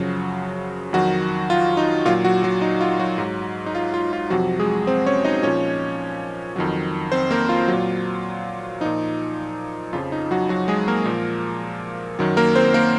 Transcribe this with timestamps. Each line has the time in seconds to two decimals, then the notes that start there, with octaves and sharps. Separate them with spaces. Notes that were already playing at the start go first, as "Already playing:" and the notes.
Already playing: F#2 C#3 F3 F#3 F#4
0.93 F2 D#3 F#3 F#4
1.50 F4
1.77 D#4
2.05 A#2 F#3 F4
2.25 F#3 F#4
2.43 F#3 F#4
2.62 D#4
2.81 F4
2.99 F#3 F#4
3.18 G#2 F#3
3.66 D#4
3.75 F4
3.94 F4
4.13 F4
4.30 F2 C3 F3 F#3 F#4
4.59 G#3 G#4
4.87 C4 C5
5.06 C#4 C#5
5.24 D#4 D#5
5.43 A#2 F3 C#4 C#5
6.56 F2 D#3 F#3
7.12 C4 C5
7.31 A#3 A#4
7.49 F4
7.68 F#3
7.73 A#2
8.81 A#2 F3 D#4
9.93 F2 C#3 F3 F4
10.12 D#4
10.31 F#3 F#4
10.49 F#3 F#4
10.68 G#3 G#4
10.88 A#3 A#4
11.05 A#2 F3
12.19 F#2 D#3 F#3
12.37 A#3 A#4
12.55 C4 C5
12.74 A#3 A#4